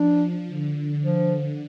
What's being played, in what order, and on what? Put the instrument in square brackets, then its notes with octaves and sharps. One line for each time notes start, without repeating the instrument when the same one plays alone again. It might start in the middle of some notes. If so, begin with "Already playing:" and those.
Already playing: [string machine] F3 [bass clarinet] D4
[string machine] D3
[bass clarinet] F3